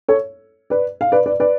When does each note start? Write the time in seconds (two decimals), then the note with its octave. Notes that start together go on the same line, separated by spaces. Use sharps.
0.08 A4 C#5
0.70 B4 D5
1.01 F5
1.12 B4 D5
1.26 B4 D5
1.40 B4 D5